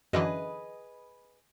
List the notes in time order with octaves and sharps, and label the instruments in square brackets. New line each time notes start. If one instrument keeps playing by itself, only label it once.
[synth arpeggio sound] F#2 D3 E3 [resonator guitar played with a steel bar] G#4 B4 D#5